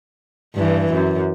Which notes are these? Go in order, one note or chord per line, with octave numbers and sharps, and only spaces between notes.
G2 E3
F#2